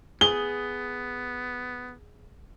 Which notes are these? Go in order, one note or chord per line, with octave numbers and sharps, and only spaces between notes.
B3 G#4 G7